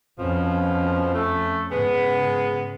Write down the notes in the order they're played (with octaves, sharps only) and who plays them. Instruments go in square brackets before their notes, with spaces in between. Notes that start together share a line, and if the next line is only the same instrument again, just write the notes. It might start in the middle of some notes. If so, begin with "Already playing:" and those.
[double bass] F2 C#4 [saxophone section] B2 F3
[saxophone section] A3
[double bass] G#2 C#3 [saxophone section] G#3 B3